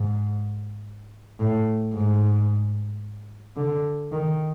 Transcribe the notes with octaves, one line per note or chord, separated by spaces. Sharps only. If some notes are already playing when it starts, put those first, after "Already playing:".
Already playing: G#2
A2
G#2
D3
D#3